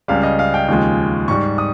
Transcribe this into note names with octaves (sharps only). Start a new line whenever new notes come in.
C#2 C#3 G3 F5
D#5
F5
G5
D#2 C#3 F3 G#3
G#2 G3 C#6
D#6